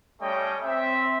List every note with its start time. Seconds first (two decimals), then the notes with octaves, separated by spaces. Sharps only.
0.21 G3 A3 C#4 C#5 D#5 G5
0.64 C4 E5